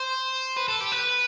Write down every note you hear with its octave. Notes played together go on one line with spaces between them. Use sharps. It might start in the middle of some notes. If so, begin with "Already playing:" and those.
Already playing: C5
B4
A4
G4
B4